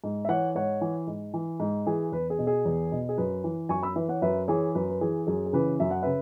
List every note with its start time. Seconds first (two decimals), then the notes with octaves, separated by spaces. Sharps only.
0.04 G#2
0.25 E5
0.29 E3 C#5 F#5
0.55 G#2 C#5 F#5
0.81 E3
1.07 G#2
1.34 E3
1.60 G#2
1.87 E3 G#4
2.12 E2 B4
2.30 G#4
2.39 B2
2.47 G#4
2.65 E2
2.92 B2
3.09 G#4
3.18 F#2 B4
3.44 E3
3.69 F#2 G#5 C#6
3.83 B5 E6
3.96 E3 B4 E5
4.09 C#5 F#5
4.22 F#2 B4 E5
4.48 E3 G#4 C#5
4.75 F#2 B4
4.90 B4
5.01 E3 G#4
5.27 F#2 G#4
5.46 G#4
5.53 C#3 E3 B4
5.80 F#2 E5
5.91 F#5
6.02 C#3 B4 E5